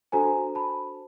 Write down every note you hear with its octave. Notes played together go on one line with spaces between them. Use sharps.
D4 F#4 A4 C5 G#5 A#5
A5 B5